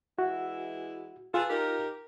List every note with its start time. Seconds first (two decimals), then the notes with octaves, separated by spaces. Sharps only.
0.19 E3 G#3 E4 F#4
1.34 F4 G#4 A4 B4
1.50 D#4 G4 A#4